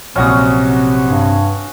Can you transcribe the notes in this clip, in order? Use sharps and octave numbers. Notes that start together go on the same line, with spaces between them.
A#1 C3 F#3 C#4 F#4 D#6
G2